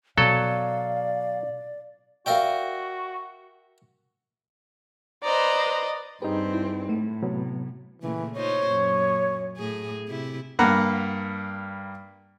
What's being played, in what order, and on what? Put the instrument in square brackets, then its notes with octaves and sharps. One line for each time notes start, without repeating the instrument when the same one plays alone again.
[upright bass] B2 [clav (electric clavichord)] F#3 A4 [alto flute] D5 [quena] F5
[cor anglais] F#4 [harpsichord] A#4 E5 G5 [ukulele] D5 F5
[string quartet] B4 C5 A#5 [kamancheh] D5 D#5
[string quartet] G2 C4 [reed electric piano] D#4 G#4 B4 [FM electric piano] G4
[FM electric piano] E4
[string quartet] A2 [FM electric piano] A3
[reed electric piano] C3 F#3 B3
[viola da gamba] A#2 C#3 A3 [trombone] E3
[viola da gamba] D#4 F4 C5 [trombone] C#5
[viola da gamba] F#2 A#2
A2 G#4
C3 E4
[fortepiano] G2 A#3 F#5 A#5 B5